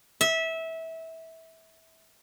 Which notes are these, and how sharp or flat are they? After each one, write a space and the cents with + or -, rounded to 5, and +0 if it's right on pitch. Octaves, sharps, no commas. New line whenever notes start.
E5 -20